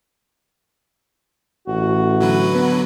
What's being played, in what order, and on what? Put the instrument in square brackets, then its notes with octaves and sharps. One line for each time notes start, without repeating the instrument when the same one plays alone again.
[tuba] A1 [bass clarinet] F#4
[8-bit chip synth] D3 F#3 B4
[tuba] B3